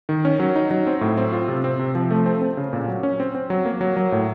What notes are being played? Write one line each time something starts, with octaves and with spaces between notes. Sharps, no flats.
D#3
C#4
F#3
D#4
F#3
C4
A2
C4
F4
C3
C4
C3
F3
A3
C4
C4
C#3
A#2
F#3
C#4
C4
C4
F#3
A#3
F#3
F#3
A2